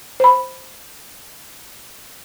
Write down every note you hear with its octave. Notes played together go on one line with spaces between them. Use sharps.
C5 B5